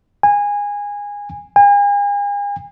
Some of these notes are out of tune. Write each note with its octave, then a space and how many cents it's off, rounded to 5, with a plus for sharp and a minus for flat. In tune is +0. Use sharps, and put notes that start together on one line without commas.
G#5 -20
G#5 -40